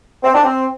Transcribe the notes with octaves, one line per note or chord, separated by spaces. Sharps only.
C4
D4
C4